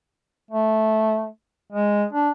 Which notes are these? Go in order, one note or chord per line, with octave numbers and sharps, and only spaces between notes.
A3
G#3
D4